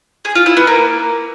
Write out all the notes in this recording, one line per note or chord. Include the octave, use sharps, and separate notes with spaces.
G#4
F4
E4
B3
A#3